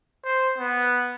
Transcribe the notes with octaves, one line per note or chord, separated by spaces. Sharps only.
C5
B3